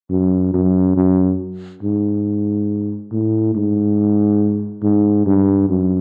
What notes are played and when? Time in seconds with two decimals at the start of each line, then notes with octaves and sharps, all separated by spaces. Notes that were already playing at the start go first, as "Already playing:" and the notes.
0.10 F#2
0.54 F#2
0.97 F#2
1.83 G#2
3.12 A2
3.55 G#2
4.83 G#2
5.26 G2
5.69 F#2